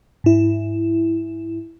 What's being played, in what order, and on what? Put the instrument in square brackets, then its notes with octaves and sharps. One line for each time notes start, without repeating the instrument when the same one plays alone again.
[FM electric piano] G#2 E4